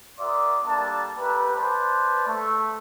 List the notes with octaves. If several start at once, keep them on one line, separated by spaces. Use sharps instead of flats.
F#4 A#4 D5 E5 C6 D#6
G3 A#3 D4 A4 A5
A3 G4 A#4 B4
B4 C5 D5 A5
A3